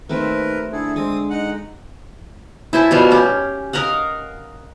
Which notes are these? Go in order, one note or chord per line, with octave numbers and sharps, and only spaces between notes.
D#2 A3 C4 A#4 B4
D3 E4 G#4 A4
G#3 C4 D#6
D#4 F#5
E4 C5 G#5 A5
B2 F3 G3 F5
C#4 G4
A#4 D#5 F5 F#5